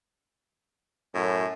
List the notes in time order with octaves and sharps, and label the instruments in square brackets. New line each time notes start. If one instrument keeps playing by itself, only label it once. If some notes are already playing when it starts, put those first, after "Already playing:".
[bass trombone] F#2 [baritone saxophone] A2